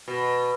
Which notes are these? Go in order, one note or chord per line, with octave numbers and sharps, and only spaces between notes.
B2